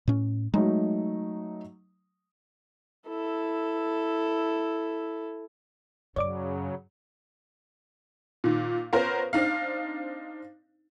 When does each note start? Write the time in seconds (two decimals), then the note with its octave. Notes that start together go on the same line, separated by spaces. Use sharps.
0.08 A2 C#4
0.54 F#3 G#3 A3 D#4
3.08 E4 A4
6.16 F#2 C#3 F#3 C#5 D5 D6
8.44 A#2 D#3
8.93 B3 C#4 F4 A#4 C5
9.33 C4 D4 D#4 F5